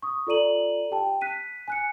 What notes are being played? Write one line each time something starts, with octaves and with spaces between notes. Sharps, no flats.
C#6 D#6
F4 A4 D5 A#5 D#7 F#7
G4 G5 A5
F#6 B6 D#7
G#5 F#6 C#7